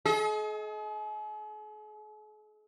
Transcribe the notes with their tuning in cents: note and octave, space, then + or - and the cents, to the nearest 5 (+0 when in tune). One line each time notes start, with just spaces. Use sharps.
G#4 +45 D#5 +30